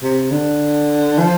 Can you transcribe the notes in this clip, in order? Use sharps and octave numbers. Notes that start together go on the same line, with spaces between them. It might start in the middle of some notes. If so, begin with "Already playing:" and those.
C3
D3
F3